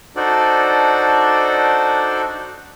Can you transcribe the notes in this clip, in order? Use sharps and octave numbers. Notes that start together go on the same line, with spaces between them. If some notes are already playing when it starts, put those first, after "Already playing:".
D4 D#4 F#4 A4 C5 D5